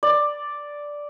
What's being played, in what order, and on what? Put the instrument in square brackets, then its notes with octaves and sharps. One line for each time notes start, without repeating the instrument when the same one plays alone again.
[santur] D5